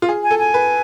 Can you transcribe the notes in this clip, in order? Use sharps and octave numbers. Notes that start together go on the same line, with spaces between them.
F4
G#4
G#5
A4
G#5
B4